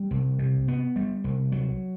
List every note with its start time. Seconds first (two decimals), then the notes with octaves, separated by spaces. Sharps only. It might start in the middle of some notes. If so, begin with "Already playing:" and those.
Already playing: G3
0.11 C2
0.39 C3
0.68 B3
0.96 G3
1.24 C2
1.52 F#3